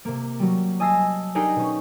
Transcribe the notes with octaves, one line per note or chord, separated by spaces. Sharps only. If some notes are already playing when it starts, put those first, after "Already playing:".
C3 A#3
F#3 G3
D#5 G#5 A5 E6 A#6 C7
D4 D#4 G4 G#4 A#4
B2 C#4